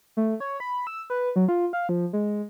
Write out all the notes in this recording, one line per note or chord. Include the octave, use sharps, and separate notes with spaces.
A3
C#5
B5
E6
B4
F#3
F4
F5
F3
G#3